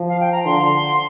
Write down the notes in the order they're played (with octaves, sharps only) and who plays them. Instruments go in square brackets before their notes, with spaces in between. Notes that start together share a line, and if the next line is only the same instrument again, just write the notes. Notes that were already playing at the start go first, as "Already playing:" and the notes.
Already playing: [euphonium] F3
[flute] F5
G5
A#5
[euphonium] D3 [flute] C6